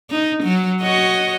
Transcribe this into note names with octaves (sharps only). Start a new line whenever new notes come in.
D#4
F#3
F#4 C#5 D#5